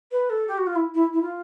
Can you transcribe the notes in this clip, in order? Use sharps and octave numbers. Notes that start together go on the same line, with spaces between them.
B4
A4
G4
F#4
F4
E4
E4
E4
F4